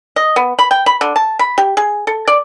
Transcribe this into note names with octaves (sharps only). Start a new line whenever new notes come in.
D#5
B3
B5
G5
B5
D3
A5
B5
G4
G#4
A4
D5